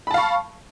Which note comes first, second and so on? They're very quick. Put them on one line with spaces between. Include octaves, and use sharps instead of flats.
B5 A5 F5 C#6